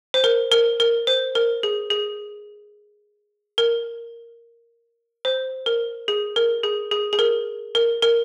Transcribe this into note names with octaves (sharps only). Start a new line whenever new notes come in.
C5
A#4
A#4
A#4
C5
A#4
G#4
G#4
A#4
C5
A#4
G#4
A#4
G#4
G#4
G#4
A#4
A#4
A#4